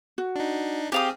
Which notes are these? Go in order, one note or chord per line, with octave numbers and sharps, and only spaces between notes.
F#4
D4 D#4
C4 G4 G#4 F5 D#6